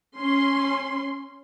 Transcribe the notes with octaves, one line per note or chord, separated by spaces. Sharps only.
C#4 C6